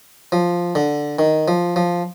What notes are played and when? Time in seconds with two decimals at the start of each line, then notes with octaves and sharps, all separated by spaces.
0.32 F3
0.75 D3
1.19 D#3
1.48 F3
1.76 F3